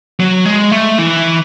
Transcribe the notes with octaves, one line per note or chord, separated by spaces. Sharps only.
F#3
G#3
A3
E3